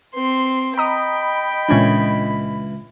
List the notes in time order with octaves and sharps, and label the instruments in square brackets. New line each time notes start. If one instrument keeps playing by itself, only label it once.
[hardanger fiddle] C4 C6
[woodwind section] D#5 B5 [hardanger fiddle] G5 [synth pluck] A#5 D#6
[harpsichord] C#2 E3 C#5 [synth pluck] A#2 C#4 D4